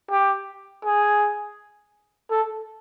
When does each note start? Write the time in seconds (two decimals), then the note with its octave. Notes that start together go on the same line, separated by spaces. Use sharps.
0.11 G4
0.84 G#4
2.30 A4